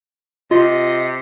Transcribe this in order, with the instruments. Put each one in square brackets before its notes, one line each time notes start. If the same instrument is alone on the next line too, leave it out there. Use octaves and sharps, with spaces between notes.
[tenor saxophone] C3 [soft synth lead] F4 [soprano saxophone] D#5